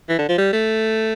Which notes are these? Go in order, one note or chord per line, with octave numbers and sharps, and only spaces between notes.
E3
D3
F3
G3
A3